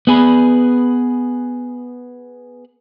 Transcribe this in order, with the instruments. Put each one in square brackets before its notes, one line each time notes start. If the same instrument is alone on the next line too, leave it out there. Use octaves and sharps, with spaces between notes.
[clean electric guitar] B3 G#4 B4